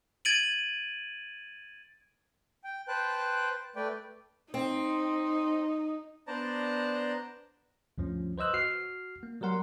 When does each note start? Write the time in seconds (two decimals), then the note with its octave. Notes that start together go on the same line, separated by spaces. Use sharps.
0.25 G#6 A6 D7 D#7 F#7
2.64 G5
2.88 B4 C5 G5 A5 F#6
3.76 A3 B4 D5 G5
4.54 C4 D#4
6.27 B3 D4 C5 D5 A5 A#5
7.98 D2 G2 F3 C#4
8.38 B4 C5 D#5 E6 F#6
8.54 F#4 F6 C7
9.23 A#3
9.41 F#3 G3 A#4 F#5 C6